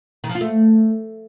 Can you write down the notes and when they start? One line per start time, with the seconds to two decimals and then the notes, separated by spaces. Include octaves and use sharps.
0.24 D#3
0.29 F3
0.35 F4
0.41 A3